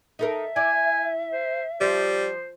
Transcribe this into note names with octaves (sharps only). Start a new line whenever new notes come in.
D#4 A4 A#4 E5
E4 D5 G#5
C5
F3 G3 C5